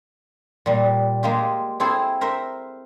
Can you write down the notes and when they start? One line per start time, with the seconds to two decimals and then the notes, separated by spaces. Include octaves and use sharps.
0.66 A#2 G3
1.23 G#3 A#3 F4 G4
1.80 C4 E4 G#4 A4 C5
2.21 A#4 C5 E5